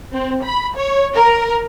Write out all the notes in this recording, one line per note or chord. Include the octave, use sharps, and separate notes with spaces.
C4
B5
C#5
A#4